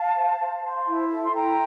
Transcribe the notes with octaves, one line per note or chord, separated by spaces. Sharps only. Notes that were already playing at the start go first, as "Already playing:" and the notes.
Already playing: F5 A5
C5
C5
C5
E4
A4
C6
E4 G5 A#5